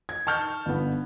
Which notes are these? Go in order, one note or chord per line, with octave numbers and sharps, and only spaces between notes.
G#6
A5 C#6 F6 G6
G1 B3